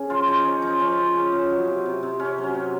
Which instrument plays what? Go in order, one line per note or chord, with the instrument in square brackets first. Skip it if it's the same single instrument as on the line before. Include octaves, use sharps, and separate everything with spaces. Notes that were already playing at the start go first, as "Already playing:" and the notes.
Already playing: [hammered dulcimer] C#3 G#4
F3 F4
F3 D#4
F3 C#4
F3 D#4
F3 C#4
F3
C#3
C#3
F#3
C3
C3
C3
C3 C#4
F#3
C#4
C3